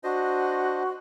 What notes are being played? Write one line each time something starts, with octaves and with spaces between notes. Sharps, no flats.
D4 F#4 C5 D#5